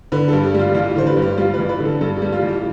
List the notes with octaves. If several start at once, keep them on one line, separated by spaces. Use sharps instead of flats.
D3 B4
A4
G2
G4
G3 F4
A1 F4
G4
D3 C5
B4
G2
G4
G3 F4
B4
A1
B4
D3
A4
G2 A4
G4
G3
F4
A1
G4